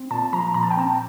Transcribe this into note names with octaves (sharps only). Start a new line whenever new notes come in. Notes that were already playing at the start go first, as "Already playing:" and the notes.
Already playing: C4
A#2 A5
F3 A#5
A#2 A#5
A5
G5
C4 A5